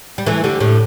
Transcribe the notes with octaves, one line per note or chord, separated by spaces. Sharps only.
G3
E3 A3
D3 G3
A2 D3